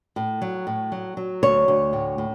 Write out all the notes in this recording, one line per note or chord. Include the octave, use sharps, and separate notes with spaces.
A2
F#3
A2
F#3
F#3
D2 C#5
D2
A2
A2